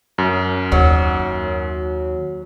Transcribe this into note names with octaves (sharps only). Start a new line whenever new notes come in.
F#2
D#2 F#3